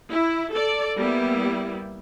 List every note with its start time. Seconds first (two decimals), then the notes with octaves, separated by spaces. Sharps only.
0.10 E4
0.52 A4 D5
0.97 G3 A#3 B3 E4